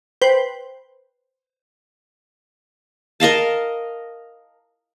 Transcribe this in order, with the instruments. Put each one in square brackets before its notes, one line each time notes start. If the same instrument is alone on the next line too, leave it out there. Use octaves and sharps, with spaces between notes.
[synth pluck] B4 C5 G5
[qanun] A#4 D#5 F5 A5